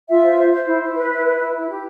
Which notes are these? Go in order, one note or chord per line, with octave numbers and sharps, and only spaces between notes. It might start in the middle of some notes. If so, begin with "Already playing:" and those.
F4 E5
C5
C5
C5
E4
E4
B4
E4
B4
E4
E4
G4